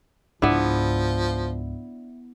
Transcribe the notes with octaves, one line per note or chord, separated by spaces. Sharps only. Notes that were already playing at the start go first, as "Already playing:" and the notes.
C#2 G#2 F3 B3 D4 E4